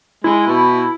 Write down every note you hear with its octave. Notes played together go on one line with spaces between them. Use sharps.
G#3 E4
B2